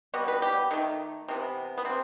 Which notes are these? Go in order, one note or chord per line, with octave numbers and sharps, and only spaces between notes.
B2 G3 B3 F#4
B4
G4
D#3 A3
C3 E3 B3
B3
C3 E3 C4